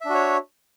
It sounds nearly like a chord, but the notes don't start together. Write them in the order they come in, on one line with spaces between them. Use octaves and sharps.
E5 D4 F#4 C#5